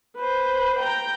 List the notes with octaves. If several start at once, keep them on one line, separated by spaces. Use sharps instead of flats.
B4 C5
G5 A#5